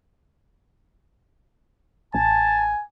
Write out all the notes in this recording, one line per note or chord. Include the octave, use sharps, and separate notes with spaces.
A1 G#5 A5